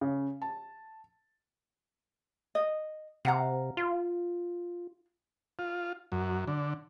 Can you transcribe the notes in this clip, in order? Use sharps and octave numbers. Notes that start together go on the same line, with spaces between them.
C#3
A5
D#5
C3 F5 F#5 A#5
F4
F4
F#2
D3